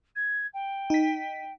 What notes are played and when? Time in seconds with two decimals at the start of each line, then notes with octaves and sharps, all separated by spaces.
0.15 G#6
0.53 G5
0.90 D#4 B6